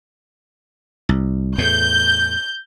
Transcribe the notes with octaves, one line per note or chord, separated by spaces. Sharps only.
C2
E2 A2 G6